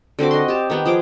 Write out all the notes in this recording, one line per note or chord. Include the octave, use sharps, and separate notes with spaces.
D3 C4 F#4 D6
D#5 C6
G4 A5
D#3 B3 G4
F3 G#4 G5 D6